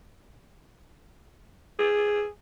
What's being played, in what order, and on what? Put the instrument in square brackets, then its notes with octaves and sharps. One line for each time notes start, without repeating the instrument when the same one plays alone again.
[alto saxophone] G#4